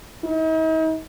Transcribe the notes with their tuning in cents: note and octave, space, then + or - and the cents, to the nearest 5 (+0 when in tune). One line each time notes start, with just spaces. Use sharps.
D#4 +45